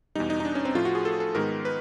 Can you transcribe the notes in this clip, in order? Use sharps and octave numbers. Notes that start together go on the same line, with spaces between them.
E2 B2 G3 D#4
D#4
D#4
D4
C#4
C4
A2 F3 A3 F4
F#4
G#4
A4
A4
G#2 D#3 G#3 B3 A#4
B4